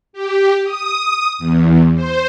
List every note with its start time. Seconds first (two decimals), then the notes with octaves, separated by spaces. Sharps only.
0.13 G4
0.64 D#6
1.39 E2
1.95 C5